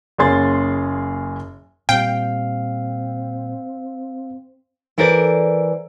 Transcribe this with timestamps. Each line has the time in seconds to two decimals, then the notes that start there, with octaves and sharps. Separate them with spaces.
0.18 F#1 A#3 C#4 G#4 C6 A6
1.89 A#2 G3 C4 F5 G5
4.98 E3 A4 A#4 C5 D5